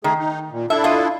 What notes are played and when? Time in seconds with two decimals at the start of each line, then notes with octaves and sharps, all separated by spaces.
0.04 D#3 A3 G#4
0.19 D#4
0.52 A#2
0.70 D4 E4 A4 E5
0.84 F4 D#5